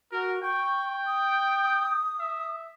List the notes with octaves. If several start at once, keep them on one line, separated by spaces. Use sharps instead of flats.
F#4 A#4
G5 C#6
D#6
E5